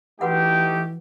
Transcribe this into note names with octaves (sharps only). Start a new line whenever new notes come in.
E3 A3 D#4 F#4 G4 B4 F#5